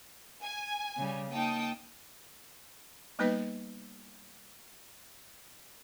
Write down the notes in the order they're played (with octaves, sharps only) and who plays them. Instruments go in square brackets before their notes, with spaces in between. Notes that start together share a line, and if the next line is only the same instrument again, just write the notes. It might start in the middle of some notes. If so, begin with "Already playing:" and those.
[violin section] G#5
[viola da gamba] C#3 G3
[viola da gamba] A#3 D#4 [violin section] G5 A5 D#6
[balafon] G3 A#3 B3 D#4 B4 D#5